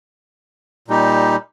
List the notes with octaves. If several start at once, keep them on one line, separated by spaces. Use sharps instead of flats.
A#2 G3 D#4 G4